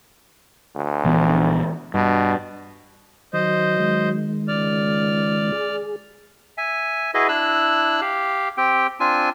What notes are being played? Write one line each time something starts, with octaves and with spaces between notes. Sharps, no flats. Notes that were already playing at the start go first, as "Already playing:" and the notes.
D2
A#1 E3 B3
G2 B2
D#3 F#3 C5 D#5
D#3 G#3
C#2 D5 F6
G#4
E5 G#5
E4 F#4 G#4 B4 D#5 E5
D4 E4 E6 F#6
G4 F5
C4 G4 G5
C4 D4 F4 G#5